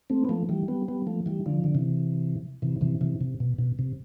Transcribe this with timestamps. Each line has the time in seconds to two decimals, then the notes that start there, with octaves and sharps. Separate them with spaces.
0.10 A3 C4
0.25 B3
0.29 F3 A3
0.49 E3 G3
0.68 G3 B3
0.88 G3 B3
1.07 F3 A3
1.26 E3 G3
1.46 D3 F3
1.64 D3
1.75 C3 E3
2.62 C3 E3
2.81 C3 E3
3.01 C3 E3
3.21 C3
3.40 B2
3.59 B2
3.79 C3